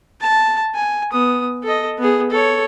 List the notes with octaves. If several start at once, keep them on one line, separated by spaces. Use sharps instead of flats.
A5
G#5
B3 D#6
A4 D#5
B3 G#4
A4 C#5